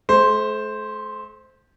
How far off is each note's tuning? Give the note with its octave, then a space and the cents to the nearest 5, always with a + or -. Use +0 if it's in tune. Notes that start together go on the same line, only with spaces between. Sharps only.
A3 -40 C5 +0